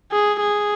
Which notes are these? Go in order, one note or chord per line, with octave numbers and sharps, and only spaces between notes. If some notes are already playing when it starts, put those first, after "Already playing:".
G#4
G#4